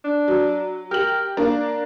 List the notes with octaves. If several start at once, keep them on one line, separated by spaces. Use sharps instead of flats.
D4
F#3
G4 A#4 F#7
A#3 D4 A#4 D5